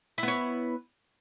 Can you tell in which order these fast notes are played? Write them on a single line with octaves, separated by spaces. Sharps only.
E4 B3 C#5